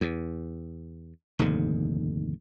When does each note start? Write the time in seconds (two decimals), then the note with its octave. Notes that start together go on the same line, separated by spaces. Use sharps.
0.01 E2
1.39 F1 D#2 G#2 D3